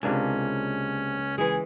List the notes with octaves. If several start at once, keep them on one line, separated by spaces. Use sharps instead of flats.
C#2 C3 A#3 C#4 D4 G#5
E3 G#3 G#4